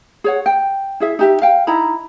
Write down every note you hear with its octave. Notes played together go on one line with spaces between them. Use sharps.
G#4 C#5 F#5
G5
E4 G#4 E5
D#4 G4 E5
F5 G5
D#4 E4 A#5 B5